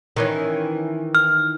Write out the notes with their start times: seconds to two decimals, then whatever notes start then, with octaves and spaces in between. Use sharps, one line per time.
0.16 D#3 E3 C#4
1.15 F6